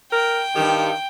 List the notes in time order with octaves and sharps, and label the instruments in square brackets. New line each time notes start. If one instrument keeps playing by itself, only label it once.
[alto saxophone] A#4 [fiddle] G5
[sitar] G2 G4 [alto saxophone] D#3